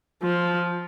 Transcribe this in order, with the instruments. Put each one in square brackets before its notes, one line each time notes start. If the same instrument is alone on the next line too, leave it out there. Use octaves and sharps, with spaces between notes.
[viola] F3